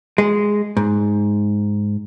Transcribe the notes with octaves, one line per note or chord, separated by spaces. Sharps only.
G#3
G#2